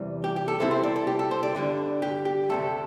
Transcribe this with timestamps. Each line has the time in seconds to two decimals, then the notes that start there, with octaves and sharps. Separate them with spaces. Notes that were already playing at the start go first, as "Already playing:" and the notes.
Already playing: E2 C3 E3 G3
0.24 G4
0.36 G4
0.48 A4
0.60 C3 G3 C4 E4 A4
0.71 C5
0.83 D5
0.96 A4
1.07 G4
1.19 A4
1.31 C5
1.43 D5
1.55 G2 D3 G3 D4
2.02 G4
2.25 G4
2.49 D2 C3 A3 A4